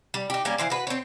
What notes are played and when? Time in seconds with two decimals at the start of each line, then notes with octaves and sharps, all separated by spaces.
0.14 G3
0.30 D#4 G4
0.45 G3 A#3 C#4
0.58 E3 F4 C5
0.70 F#4 B4
0.87 C4 C#5